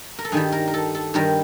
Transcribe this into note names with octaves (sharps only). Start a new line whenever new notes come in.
A#4
A4
G2 D#3 G3 G#4
A#4
A#4
A4
A4
G2 D#3 G3 A#4